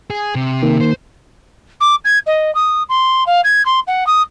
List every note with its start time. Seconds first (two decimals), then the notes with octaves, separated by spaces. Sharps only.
0.10 G#4
0.35 C3
0.63 D#3 A#3
0.81 C5
1.80 D6
2.04 G#6
2.26 D#5
2.54 D#6
2.89 C6
3.26 F5
3.44 G#6
3.65 C6
3.87 F#5
4.06 D#6